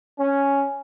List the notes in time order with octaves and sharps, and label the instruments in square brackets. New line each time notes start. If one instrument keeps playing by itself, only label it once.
[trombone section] C#4